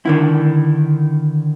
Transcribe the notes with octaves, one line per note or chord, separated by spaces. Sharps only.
D3 D#3 E4